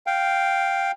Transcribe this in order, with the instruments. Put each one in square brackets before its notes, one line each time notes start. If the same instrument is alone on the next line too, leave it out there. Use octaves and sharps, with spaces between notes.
[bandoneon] F5 G5